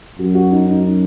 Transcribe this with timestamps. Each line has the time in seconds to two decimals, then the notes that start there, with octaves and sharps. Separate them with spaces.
0.19 F#2 F#4
0.35 F#4
0.51 D#4
0.67 D#4
0.83 D#4